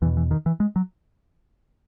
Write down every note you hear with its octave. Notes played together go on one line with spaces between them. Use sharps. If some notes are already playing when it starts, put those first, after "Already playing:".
E2 B2 E3
E3
D#3
E3
G#3
F#3